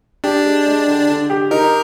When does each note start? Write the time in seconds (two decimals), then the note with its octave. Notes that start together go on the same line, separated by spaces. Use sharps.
0.24 D4 G4
0.45 G#3
0.66 G#3
0.87 D3
1.08 D3
1.30 G4
1.51 D#4 A#4